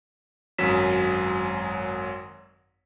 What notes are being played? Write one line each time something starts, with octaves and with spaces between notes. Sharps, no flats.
G#1 F#2 F#3 B6 E7